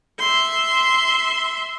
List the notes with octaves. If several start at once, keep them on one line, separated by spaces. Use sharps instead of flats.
E5 C6